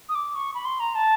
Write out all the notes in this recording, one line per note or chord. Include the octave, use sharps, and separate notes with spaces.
D#6
D6
C#6
B5
C6
A#5
A5